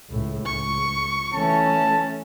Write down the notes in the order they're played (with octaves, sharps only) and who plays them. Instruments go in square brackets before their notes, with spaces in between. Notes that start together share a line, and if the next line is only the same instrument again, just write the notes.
[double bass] C#2 A2
[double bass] C#2 [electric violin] C#6
[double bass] E3 A3 [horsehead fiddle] C#4 [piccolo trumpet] A5